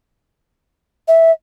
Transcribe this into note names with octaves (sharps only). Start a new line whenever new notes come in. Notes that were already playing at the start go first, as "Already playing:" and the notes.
E5